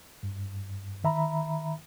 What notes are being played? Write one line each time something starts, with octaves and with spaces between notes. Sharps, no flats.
G2
D#3 E5 A#5 B5